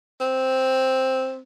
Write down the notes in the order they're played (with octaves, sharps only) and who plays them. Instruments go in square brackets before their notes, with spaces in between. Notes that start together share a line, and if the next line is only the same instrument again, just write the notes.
[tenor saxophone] C4